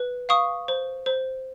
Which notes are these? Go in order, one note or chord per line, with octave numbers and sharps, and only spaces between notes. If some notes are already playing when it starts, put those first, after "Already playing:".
Already playing: B4
F5 C#6 D#6
C5
C5